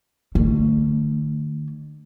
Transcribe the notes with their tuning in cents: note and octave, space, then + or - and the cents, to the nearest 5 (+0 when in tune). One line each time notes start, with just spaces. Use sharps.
D3 +40 A3 +25